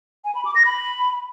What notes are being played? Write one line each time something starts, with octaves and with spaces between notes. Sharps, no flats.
G#5
B5
D6
A#6
B5